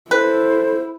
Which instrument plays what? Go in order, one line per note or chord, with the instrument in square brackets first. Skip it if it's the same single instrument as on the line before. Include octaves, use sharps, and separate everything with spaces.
[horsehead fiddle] E4 [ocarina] A4 [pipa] B4 [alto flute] C5